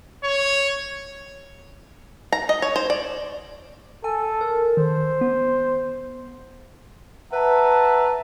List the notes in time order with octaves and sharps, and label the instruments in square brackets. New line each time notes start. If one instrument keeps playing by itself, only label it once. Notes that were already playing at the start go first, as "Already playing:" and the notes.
[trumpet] C#5
[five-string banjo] A#5
D#5
C#5
C5
D5
[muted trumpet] A4 [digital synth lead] G#5
[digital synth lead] A#4
[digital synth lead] D#3 [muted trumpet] C5
[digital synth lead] B3
[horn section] B4 E5 F#5 A5 A#5